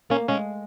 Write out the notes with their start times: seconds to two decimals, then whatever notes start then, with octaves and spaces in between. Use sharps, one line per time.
0.10 A#3 C#4
0.29 G#3 C#4